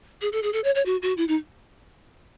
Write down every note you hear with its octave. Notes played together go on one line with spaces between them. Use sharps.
G#4
A4
G#4
A4
C#5
C#5
F#4
F#4
E4
D#4